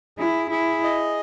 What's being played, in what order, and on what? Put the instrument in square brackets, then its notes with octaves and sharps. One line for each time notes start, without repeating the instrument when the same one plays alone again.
[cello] E4 [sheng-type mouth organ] G#4
[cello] E4 [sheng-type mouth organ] G#4
[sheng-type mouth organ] D#5